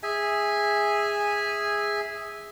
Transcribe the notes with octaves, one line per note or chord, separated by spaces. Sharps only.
G#4 E5 G#5